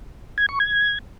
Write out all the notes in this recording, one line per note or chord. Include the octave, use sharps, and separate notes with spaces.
G#6
C#6
G#6